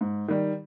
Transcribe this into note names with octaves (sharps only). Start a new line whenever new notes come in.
G#2
D#3 G3